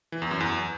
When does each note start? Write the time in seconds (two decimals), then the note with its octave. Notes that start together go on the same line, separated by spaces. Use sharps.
0.12 E3
0.22 E2
0.31 F#2
0.40 E2